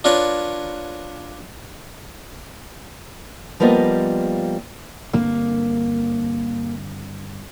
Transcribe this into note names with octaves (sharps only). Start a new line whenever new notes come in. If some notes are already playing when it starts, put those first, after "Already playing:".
D4 F4 A#4 B4 C#5
F3 G3 A#3 B3 F4 D#5
G2 D3 A#3 C4